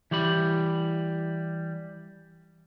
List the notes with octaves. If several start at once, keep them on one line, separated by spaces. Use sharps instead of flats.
E3 G3 G4 B5